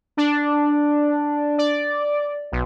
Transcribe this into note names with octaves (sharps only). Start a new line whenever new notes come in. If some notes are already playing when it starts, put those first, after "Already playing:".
D4
D5
B1